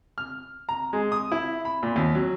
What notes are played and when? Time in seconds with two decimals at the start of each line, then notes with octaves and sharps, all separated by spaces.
0.18 F6
0.69 A#5
0.93 G#3
1.12 D#6
1.32 E4
1.65 B5
1.83 A#2
1.96 D#2
2.15 F#3